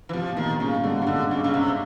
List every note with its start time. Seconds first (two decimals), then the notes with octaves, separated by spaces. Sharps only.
0.09 E3
0.13 C3 F3
0.32 B2
0.37 A#2 D#3
0.60 G#2 C#3
0.74 G#2
0.84 G2 D3
0.96 G2
1.02 C#3
1.07 G#2 D3
1.31 C#3
1.44 C#3
1.54 C3